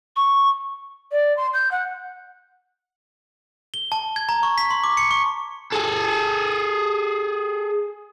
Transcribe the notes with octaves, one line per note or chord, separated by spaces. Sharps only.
C#6
D5
C6
G6
F#5
G7
A5
G#6
A#5
C#6
B6
C6
D6
C#7
C#6
G#4 A4